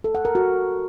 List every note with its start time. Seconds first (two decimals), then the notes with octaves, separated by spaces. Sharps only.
0.04 A4
0.15 F#5
0.25 A#4
0.35 F#4